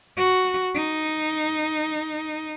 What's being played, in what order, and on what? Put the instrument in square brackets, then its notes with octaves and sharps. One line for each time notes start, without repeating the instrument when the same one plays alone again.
[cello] F#4
D#4